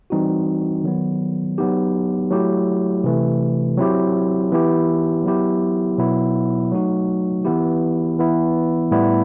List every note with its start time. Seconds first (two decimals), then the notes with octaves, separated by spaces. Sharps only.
0.10 E3 G3 C4 D#4 F#4
0.84 D#3 F#3 B3
1.58 F#3 B3 D#4 G4
2.30 F#3 A3 E4 G4
3.04 C3 E3 A3
3.78 F#3 C4 E4 G4
4.52 E3 B3 E4 G4
5.24 F#3 B3 E4 G4
5.98 B2 F#3 B3 E4
6.72 F#3 A3 D#4 F#4
7.44 E3 B3 E4 G4
8.18 E3 B3 E4
8.91 A2 G3 B3 E4